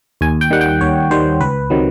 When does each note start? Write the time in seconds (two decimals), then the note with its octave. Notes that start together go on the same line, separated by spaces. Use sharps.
0.21 D#2 G#5
0.41 G5
0.51 D#3 G3 F#5
0.61 G5
0.81 D#2 C#5
1.11 D#3 G3 C5
1.40 C#2 B4
1.70 C3 D#3 F#3